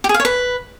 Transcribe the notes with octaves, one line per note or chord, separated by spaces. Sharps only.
G4
G#4
F5
C#5
B4